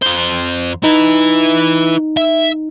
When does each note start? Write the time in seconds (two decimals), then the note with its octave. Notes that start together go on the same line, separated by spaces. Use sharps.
0.02 F2 C5
0.84 D#4 E4 B4
2.17 E5